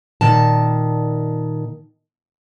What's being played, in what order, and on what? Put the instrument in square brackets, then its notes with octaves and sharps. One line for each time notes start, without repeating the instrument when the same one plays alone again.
[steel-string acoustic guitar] A#2 D#3 A5